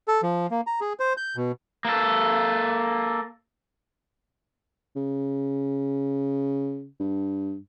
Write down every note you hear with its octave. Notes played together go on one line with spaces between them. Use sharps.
A4
F3
A#3
A#5
G#4
C5
G6
B2
A#3 A4
C#3
G2